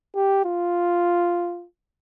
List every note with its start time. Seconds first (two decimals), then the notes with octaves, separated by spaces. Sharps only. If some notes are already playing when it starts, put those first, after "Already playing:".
0.15 G4
0.45 F4